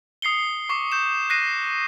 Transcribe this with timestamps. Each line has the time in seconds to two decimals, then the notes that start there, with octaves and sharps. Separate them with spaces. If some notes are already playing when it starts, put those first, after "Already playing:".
0.22 D#6 C7 C#7 G7
0.69 C#6 D6 C7
0.92 C#6 G6 E7
1.30 F#6 A#6 C7 D#7